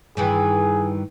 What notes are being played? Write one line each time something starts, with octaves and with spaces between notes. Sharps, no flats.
G2 D#3 E3 G#4